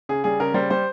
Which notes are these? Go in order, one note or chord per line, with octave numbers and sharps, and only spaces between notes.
C#3 G#4
G3 G#4
C#3 A#4
G3 C5
G3 C5